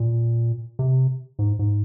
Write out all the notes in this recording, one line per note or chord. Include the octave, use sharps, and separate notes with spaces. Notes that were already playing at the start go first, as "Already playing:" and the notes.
Already playing: A#2
C3
G#2
G#2